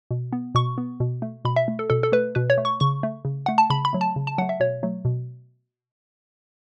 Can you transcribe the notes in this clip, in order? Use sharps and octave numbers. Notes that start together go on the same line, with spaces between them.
B2
B3
B2 C#6
B3
B2
A3
B2 B5
E5
A3
A4
B2 A4
A4
A3 B4
B2 B4
C#5
A3
C#6
C#3 C#6
A3
C#3
A3 F#5
A5
C#3 B5
B5
F#3 A3
A5
C#3
A5
F#3 A3 F#5
E5
B2 C#5
F#3 A3
B2